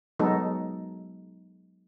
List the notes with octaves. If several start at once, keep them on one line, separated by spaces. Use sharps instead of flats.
F#3 G#3 B3 D#4 A4